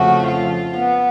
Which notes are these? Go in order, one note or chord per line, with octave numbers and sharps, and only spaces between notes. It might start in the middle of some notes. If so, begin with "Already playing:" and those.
Already playing: F2 C#3 F3 A3 F#4
F4
B3